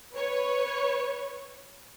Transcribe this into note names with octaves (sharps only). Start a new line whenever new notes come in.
B4 C#5